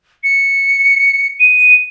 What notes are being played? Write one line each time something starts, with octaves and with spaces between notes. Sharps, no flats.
C#7
D#7